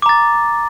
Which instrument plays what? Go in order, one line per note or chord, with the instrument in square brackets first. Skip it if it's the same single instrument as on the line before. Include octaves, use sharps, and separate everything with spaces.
[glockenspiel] D6
A#5
A6